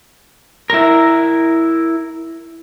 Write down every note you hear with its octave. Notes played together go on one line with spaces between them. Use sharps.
E4 A#4